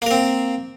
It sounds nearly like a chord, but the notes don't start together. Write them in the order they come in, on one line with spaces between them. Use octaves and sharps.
A#3 A#4 C4